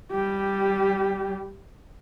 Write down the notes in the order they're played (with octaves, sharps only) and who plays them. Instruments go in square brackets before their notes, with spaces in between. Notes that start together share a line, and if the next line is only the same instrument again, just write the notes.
[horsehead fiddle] G3 G4